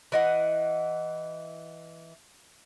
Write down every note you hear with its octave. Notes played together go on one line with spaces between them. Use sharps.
E3 D#5 F#5